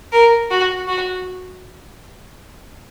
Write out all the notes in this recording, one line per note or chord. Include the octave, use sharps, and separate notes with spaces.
A#4
F#4
F#4